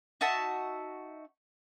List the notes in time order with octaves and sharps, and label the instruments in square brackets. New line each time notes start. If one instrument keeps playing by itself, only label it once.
[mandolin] D#4 F#4 E5 A5